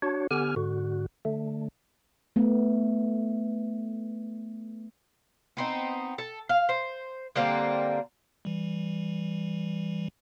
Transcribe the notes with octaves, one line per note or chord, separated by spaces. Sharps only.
D4 F#4 C#5
D3 B3 G4 G#5 F6
G#2 D3 F#4
D3 A3
A3 B3
B3 C4 D#4
A4
F5
C5
D3 G3 A#3 C4
E3 G3